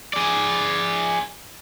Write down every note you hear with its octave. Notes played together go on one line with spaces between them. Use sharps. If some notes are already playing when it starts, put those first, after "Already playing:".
G#4 D5